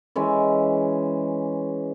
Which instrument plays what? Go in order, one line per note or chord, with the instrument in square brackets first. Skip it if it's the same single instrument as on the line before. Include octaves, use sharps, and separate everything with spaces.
[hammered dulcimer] E3 G#3 C#4